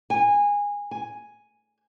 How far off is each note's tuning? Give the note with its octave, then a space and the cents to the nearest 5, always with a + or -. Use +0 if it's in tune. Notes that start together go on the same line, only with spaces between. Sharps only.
G#5 -20
G#5 +0